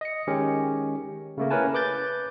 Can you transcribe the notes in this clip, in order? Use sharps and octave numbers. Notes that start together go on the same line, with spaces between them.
D#5 C#7
D#3 G#3 C#4 G4
C#3 A3 A#3
C#4 E4 A#4 B4 G#5 A5
B4 D6 F#6 G6 A6